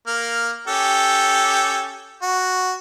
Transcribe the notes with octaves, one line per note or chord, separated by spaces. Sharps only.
A#3 F6
C#4 G4 A4
F#4